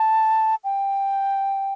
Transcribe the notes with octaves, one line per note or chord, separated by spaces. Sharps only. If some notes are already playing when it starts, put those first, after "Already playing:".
Already playing: A5
G5